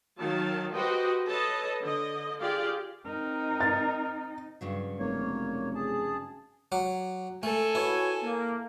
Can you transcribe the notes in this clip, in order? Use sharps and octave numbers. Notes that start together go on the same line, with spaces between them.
D#3 F#3 F5 A5
F#4 G4 B4 C5 D#5 G5
A4 B4 C#5 D#5 A5
D3 D#5
F4 G4 G#4 D5 F5
C4 D#4 A#4
A6
G2 C#3 F#3
F1 A#3 C#5
G#4 A5
F#3 D6
A3 A4 G#5
E4 F#4 B4 C#5
A#3